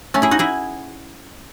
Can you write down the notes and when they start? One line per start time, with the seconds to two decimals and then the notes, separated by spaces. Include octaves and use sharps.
0.14 A3 C#4
0.22 E4 G#4
0.31 D#4 F#4
0.39 E4 G#4